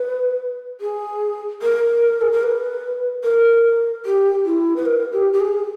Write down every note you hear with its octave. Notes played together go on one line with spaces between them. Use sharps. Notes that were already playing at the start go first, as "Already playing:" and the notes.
Already playing: B4
G#4
A#4
G#4
A#4
B4
A#4
G4
E4
B4
A#4
G4
G4
G#4